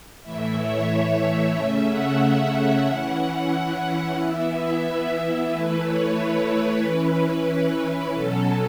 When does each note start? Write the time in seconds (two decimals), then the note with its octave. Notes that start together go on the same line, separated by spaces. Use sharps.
0.23 A2 E3 A3 E4 E5
0.57 C#5
1.55 C#3 A3 C#4 E5
1.89 F#5
2.88 E3 C#4 E4
3.52 F#5
4.18 E3 B3 E4 E5
5.50 E3 A3 E4 B4
5.83 C#5
6.16 B4
6.82 E3 C#4 E4 B4
8.13 B2 F#3 C#4 A4